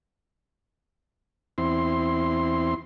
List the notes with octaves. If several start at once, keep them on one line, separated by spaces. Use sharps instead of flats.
E2 C4 E4 C6